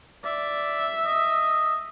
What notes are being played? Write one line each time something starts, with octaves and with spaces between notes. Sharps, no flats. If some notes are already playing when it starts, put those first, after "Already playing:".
D5 E5
D#5